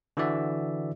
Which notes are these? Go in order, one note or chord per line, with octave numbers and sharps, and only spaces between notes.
D3 E3 F#4 D5 E5